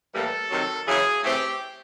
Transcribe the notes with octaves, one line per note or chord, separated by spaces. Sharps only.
A2 E3 G3 A#3 A4
C3 D#3 F#3
F#2 C#3 E3 G#4
A2 E3 A3 C4 G4